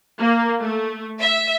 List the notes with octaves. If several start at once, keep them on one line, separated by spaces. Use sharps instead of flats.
A#3
A3
E5